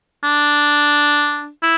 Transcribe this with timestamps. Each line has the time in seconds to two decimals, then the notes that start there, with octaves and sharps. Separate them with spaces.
0.23 D4
1.63 E4